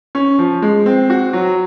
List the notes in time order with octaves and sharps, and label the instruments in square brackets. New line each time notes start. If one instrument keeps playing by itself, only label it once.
[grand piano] C#4
F3
G#3
C4
F#4
F#3